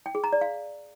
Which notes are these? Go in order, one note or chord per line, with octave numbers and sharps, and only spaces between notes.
G5
G#4
A#5
D5
F5